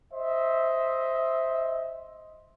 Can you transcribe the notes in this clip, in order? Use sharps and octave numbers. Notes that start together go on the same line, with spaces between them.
C5 D#5 E5